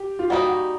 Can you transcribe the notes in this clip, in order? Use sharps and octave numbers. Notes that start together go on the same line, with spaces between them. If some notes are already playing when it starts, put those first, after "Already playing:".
Already playing: G4
F4
G3 A#3 D#4 F#4
F#4